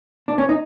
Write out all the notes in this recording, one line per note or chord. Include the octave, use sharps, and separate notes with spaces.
D4
C#4
D#4